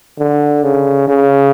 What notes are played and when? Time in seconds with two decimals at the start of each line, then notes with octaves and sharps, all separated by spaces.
0.18 D3
0.63 C#3
1.08 C#3